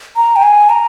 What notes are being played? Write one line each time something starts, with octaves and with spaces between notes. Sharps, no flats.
A#5
G5
G#5
A#5